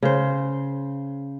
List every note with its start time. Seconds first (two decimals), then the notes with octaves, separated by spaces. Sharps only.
0.03 C#3 C5